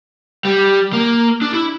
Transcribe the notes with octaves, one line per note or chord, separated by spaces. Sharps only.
G3
A#3
D4
E4